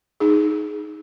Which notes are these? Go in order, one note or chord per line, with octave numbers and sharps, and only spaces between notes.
D#4 G#4